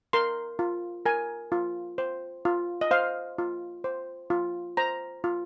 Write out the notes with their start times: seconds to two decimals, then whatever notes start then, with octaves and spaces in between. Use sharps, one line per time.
0.13 A#4 C6
0.59 F4
1.06 A#4 G#5
1.52 F4
1.98 C5
2.45 F4
2.81 D#5
2.91 C5 F5
3.38 F4
3.84 C5
4.30 F4
4.77 C5 A#5
5.24 F4